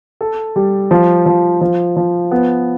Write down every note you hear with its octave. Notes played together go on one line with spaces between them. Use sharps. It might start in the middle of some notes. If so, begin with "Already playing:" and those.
A4
G3
F3
F3
F3
F3
B3